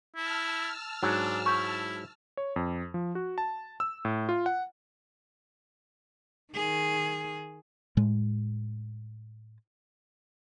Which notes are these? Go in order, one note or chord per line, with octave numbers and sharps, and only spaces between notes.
E4 A5 E6 F6
G#2 F#3 D4
E4 C#6 G6
C#5
F2
F3
F#4
A5
E6
A2
F4
F#5
D#3 G#4
A2 G#3